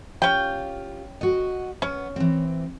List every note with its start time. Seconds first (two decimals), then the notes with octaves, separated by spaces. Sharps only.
0.22 C#4 F4 G4 F5 G5
1.21 F#4 D#5
1.82 B3 C#4
2.16 E3 C4